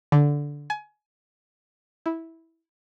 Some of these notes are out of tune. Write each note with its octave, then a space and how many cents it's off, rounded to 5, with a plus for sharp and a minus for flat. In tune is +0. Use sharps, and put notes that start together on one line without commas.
D3 -10
G#5 +25
E4 -10